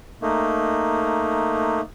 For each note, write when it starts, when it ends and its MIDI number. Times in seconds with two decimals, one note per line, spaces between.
0.22 1.81 57
0.22 1.81 58
0.22 1.81 63